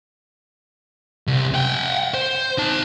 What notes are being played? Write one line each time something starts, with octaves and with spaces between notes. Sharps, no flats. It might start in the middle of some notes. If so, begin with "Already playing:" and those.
C2
F#5 G5
C5
D#4 A5